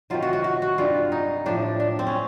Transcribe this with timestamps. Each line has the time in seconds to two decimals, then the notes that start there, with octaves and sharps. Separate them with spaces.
0.10 C3 D#3 F#3 F4
0.22 F#4
0.33 F#4
0.44 F#4
0.62 F#4
0.78 G2 E3 G3 F4
1.12 D#4
1.46 A2 F3 D4
1.80 D4
1.99 C4
2.07 C#4